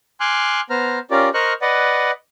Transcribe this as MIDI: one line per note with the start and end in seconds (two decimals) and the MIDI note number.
0.20 0.61 80
0.20 0.61 84
0.20 0.61 86
0.20 0.61 89
0.20 0.61 90
0.70 0.99 59
0.70 0.99 72
0.70 0.99 82
0.70 0.99 89
1.11 1.29 61
1.11 1.29 65
1.11 1.29 67
1.11 1.29 70
1.11 1.29 74
1.34 1.53 70
1.34 1.53 72
1.34 1.53 75
1.34 1.53 85
1.34 1.53 89
1.34 1.53 90
1.62 2.11 71
1.62 2.11 74
1.62 2.11 75
1.62 2.11 78